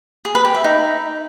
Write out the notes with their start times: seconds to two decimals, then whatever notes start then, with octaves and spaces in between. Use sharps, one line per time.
0.25 G#4
0.35 B4
0.45 G4
0.55 E5
0.64 D#4